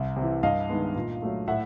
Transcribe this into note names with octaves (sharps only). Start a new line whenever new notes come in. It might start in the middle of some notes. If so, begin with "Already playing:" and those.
Already playing: C2
C3
E3
G2 D#5 F5
D#3 G#3 B3
A#2
F#3 A3
A2 E5 F#5